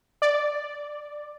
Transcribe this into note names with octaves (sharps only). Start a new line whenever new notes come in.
D5